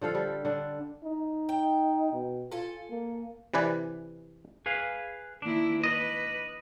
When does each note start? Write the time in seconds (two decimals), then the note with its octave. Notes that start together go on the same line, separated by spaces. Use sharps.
0.01 D3 F3 A4 F5
0.15 G3
0.45 D3 D4
1.04 D#4
1.49 G5
2.13 B2
2.52 F4 A4 G#5
2.90 A#3
3.54 C3 E3 B4 D5 G#5
4.66 G#4 B4 F5
5.42 D#3 A#3 D4 E4
5.84 B4 D#5